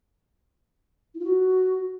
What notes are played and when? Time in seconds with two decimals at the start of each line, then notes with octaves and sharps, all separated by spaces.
1.15 E4
1.20 F4
1.25 F#4